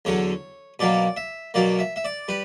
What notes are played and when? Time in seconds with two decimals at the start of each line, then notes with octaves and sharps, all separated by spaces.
0.05 E2 D3 F#3 C#5
0.79 B2 F#3 A#3 D5
1.17 E5
1.54 B2 F#3 A#3 D5
1.79 E5
1.96 E5
2.04 D5
2.28 G3 B4